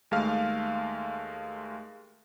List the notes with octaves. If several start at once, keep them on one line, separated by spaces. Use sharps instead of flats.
D#2 G#3 A3 F5 F6